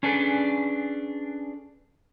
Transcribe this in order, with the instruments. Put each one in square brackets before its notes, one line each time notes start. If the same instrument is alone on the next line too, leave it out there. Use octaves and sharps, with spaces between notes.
[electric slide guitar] C#4 D4 G#4 A4 B4 D5